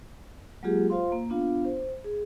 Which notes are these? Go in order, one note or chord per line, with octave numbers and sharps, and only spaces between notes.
F#3 G#3 A#3 F4 G4 G#4
F4 C5 F5 C6
A#3
B3 D4 F4 F5
C5
G#4